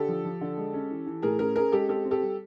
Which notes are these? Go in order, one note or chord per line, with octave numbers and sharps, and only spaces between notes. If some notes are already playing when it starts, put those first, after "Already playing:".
Already playing: D3 G4 A4
F3
F3
D3
G#3
C#4
E3
E3
A2 G#4 A#4
C#4 G#4 A#4
C#4 G#4 A#4
G#3 G4 A4
C4 G4 A4
C4
G4 A4
G3